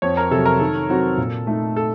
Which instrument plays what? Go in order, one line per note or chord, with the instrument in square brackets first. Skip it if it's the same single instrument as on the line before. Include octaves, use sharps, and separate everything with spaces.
[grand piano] F2 [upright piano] C#5
[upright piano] A#4
[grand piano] C3 F#3 [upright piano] A4
[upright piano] A#4
[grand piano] D#3 [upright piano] A4
[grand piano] F#3 C4 F#4
A#2
A3 D#4
[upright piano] A4